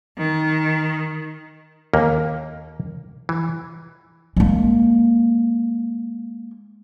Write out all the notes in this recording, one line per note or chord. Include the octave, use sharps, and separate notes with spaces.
D#3
D#2 A#3
E3
G#3 A#3